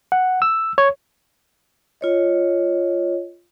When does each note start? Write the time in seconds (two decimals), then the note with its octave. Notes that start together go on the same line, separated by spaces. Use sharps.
0.12 F#5
0.42 E6
0.78 C#5
2.01 F4 C#5 D#5